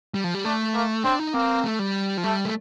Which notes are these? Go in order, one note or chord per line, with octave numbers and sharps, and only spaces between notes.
G3
F3
G3
A3 D4
A#3
C4 D4
D#4
A#3 C4
A3
G3
F3
G3 A3
A3